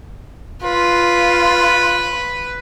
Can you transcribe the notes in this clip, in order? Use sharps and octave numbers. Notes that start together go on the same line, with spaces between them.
F4 B4